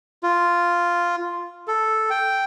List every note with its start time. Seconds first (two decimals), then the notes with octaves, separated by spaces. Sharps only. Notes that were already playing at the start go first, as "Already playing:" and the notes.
0.23 F4
1.68 A4
2.10 G5